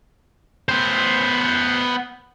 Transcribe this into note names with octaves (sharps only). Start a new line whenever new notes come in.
B3 C5